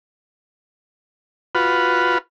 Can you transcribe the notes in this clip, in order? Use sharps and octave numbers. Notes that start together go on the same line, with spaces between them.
F4 F#4 B4